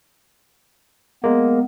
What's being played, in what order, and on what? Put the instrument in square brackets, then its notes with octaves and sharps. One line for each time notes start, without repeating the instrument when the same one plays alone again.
[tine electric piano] G#3 A#3 [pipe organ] B3